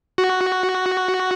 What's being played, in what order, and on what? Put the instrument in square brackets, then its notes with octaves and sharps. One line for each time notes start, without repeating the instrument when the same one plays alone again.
[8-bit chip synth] F#4